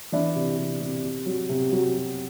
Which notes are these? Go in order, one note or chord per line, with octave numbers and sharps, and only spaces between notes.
E3 D4 E4
C3
C3
C3
C3
F#3
C3
F#3